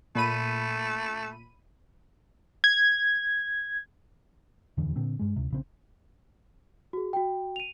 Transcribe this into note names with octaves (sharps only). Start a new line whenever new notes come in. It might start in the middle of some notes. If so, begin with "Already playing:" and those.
A#2 A3 B5 D#7
G#6
D#1 F2 D3 E3
A#2 D3 C4
G2 G#3
D2 C3
A#1 C#3 C4
F#4 G#4
F#4 G5
D#7 F7